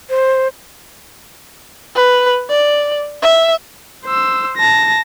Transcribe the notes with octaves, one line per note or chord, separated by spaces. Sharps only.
C5
B4
D5
E5
C5 E6
A5 A#6